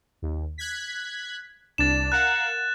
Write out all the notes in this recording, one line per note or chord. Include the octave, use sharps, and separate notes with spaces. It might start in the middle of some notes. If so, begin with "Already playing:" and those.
D#2
F#6 G#6 B6
C2 D4 A6 E7
A#4 F5 F#5 F#6